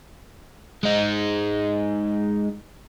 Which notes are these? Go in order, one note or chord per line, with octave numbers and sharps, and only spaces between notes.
G#3 D#4